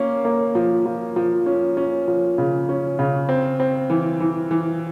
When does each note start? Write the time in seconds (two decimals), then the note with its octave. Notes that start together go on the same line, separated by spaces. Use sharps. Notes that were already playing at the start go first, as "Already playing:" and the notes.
Already playing: A#3 C#4
0.25 A#3
0.55 F3
0.86 F3
1.16 F3
1.46 C#4
1.77 C#4
2.08 F3
2.38 C#3
2.69 C#4
2.99 C#3
3.29 C4
3.60 C4
3.90 E3
4.20 E3
4.51 E3